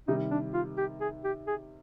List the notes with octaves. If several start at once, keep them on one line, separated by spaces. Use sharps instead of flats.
C3 D#3 G3 D#4
D4
F4
G4
G#4
G4
G#4